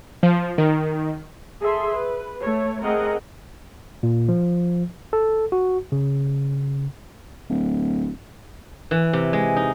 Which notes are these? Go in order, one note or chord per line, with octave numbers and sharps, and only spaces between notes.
F3
D#3
G#4 A4 E5 C6
B4
A3 C#5
A3 C4 G#4 A#4 D#5 F#5
A#2
F3
A4
F#4
C#3
D1
E3
C3
G#3
D#4